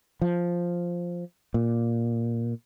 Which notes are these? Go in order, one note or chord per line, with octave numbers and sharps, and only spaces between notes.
F3
A#2